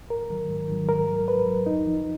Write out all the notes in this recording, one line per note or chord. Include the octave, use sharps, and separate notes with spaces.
G#2 A#4
D#3 F#3
G#2
D#3 F#3
G#2 A#4
F#3
G#2 B4
F#3
F2 D#4
F3